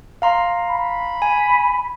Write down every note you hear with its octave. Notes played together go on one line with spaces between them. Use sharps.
F5 A#5 C6
B5
G#5